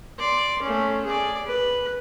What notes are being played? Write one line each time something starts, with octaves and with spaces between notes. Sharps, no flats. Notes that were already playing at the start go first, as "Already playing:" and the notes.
D5 C6
A3 C#4
G#4 D5
B4